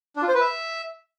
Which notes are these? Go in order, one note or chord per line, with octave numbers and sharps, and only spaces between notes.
D4
F4
C5
B4
E5